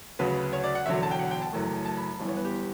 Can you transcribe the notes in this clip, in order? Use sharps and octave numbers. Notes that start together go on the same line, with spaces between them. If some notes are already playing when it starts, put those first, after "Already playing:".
D2 C#3 F#3 B4
C#5
D5
F#5
E1 E2 D3 F#3 E5
A5
G5
F#5
G5
A5
F#1 F#2 E3 A3
A5
B5
G1 G2 E3 B3
C#5
B4
G4